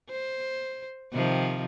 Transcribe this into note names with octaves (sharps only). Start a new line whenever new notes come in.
C5
C3 D#3 F3